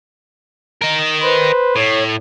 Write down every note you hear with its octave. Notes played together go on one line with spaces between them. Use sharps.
A#4 D#5
B4 C5
A2 C#5